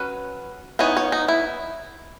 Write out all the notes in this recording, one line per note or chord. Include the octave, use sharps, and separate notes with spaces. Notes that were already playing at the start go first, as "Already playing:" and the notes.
Already playing: F#3 C#4 B4
E3 B3 D#4 C#5
C#5
D#4
E4